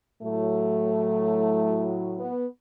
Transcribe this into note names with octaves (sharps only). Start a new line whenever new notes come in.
A2 F#3 A3
B3